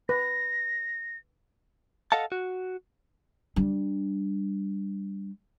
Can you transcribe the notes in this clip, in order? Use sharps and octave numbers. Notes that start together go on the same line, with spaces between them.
B4 A#6
A4 D#5 F5 F#5 A5
F#4
G3 D4